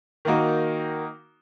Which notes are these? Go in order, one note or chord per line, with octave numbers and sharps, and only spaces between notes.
D#3 A#3 D#4 F#4